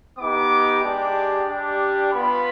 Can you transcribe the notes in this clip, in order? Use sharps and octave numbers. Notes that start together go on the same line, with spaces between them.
B3 D#4 G4 D6
G#3 D4 G4
G3 D4 G4
B3 F4 B5